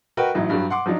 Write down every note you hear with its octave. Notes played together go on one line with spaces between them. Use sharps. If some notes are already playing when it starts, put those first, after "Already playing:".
F#4 A#4 B4 D#5 G5
A1 A2 F#3 D#4
G2 F#3 G3
F#5 C6 D6
F3 F#3 D4 D#4